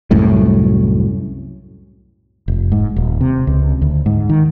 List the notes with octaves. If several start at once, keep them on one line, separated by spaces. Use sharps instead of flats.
C2 F#2 A2
F1
G#2
D#1
C3
C#2
D2
G#2
D#3